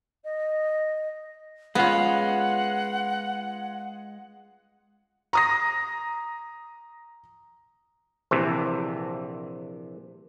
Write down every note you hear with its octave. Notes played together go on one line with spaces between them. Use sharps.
D#5
G#3 B3 C#4 F4 F#5
A#5 D#6 A#6
A#1 C3 E3